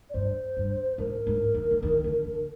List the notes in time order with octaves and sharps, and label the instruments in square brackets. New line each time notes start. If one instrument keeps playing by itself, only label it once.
[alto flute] D5
[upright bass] G2 [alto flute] C5
[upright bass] G2
[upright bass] G#2 [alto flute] A#4
[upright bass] G#2
D#3
D#3
D#3
D3
D3